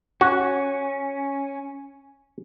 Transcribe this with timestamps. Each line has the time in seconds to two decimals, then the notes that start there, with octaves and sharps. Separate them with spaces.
0.21 C#4 F#4